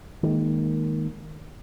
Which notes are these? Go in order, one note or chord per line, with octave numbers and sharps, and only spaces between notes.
D#3 G#3 A#3